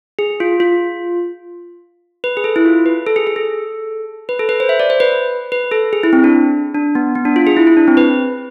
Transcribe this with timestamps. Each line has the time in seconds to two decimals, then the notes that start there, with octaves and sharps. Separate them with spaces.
0.19 G#4
0.40 F4
0.60 F4
2.24 B4
2.37 G#4
2.44 A4
2.56 E4
2.66 F4
2.86 B4
3.07 A4
3.16 G#4
3.27 G#4
3.36 A4
4.29 B4
4.39 A4
4.49 B4
4.60 C5
4.69 E5
4.80 D5
4.90 C5
5.00 B4
5.52 B4
5.72 A4
5.93 G#4
6.04 E4
6.13 C4
6.24 D4
6.75 D4
6.95 B3
7.15 B3
7.25 D4
7.36 F4
7.47 G#4
7.56 E4
7.67 E4
7.77 D4
7.88 C4
7.97 B4